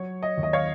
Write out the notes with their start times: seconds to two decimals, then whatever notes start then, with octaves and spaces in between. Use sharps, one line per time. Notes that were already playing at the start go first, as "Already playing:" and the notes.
Already playing: F#3 C#5
0.23 D#5
0.37 D#2
0.43 D#5
0.53 C#5 F5